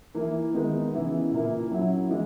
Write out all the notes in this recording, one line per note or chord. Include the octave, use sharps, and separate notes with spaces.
E3 A#3 E4
D#3 G#3 B3 D#4
C#3 E3 B3 E4
A#2 A#3 E4
F#3 C#4 E4
E3 G#3